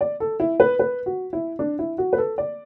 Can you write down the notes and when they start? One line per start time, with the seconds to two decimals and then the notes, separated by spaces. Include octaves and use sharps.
0.01 D5
0.20 A4
0.40 E4
0.60 B4
0.79 B4
1.06 F#4
1.33 E4
1.59 D4
1.79 E4
1.98 F#4
2.13 B4
2.18 A4
2.38 D5